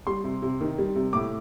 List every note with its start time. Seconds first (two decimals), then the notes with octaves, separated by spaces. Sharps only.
0.07 G3 C6
0.24 C3
0.42 C3
0.61 D#3
0.78 G3
0.95 C3
1.13 A2 D6